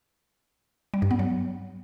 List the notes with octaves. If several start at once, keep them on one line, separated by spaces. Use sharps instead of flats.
G3
G2
B3
F#3